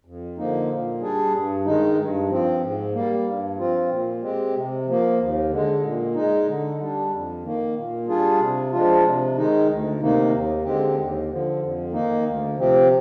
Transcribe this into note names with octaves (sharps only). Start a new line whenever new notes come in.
F2
D3 F3 A#3 D#4
A#2
G3 D4 G#4
G2
D#3 G#3 D#4
G2
F3 C4
G#2
G3 A#3
G2
F3 C4 F4
A#2
G#3 C4 G4
C3
F3 A#3
D#2
D3 G#3
A#2
G#3 D#4
D3
G3 D4
F2
D#3 A#3
A#2
G3 D4 F4 G#4
C3
F3 G#3 D4 F4
C3
D#3 G#3 D#4
D2
C3 D#3 A#3 D#4
D#2
D3 G#3 C4 G4
D#2
D3 F3
F2
D#3 A#3 D#4
D2
C3 F3 C4 G4